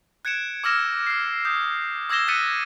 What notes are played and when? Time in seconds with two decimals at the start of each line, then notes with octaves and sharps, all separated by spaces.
0.25 F#6 G#6 C#7 D7 E7
0.64 D6 E6 F6 A#6 E7
1.07 F6 C7
1.45 D#6 G6
2.10 D6 E6 G#6 A#6 E7 G7
2.28 E6 F#6 A6 B6 C#7 D#7